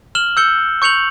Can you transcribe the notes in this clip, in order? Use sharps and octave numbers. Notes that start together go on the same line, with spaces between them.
F6 E7 F#7 G7
E6 G6 C#7 G7
C#6 G6 C#7 F7 F#7